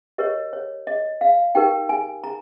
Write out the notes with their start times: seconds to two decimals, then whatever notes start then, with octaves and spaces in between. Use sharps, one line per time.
0.18 G4 A#4 C#5 D#5
0.53 C#5
0.87 D#5
1.21 F5
1.55 D#4 G4 A#4 G5
1.89 G#5
2.24 A#5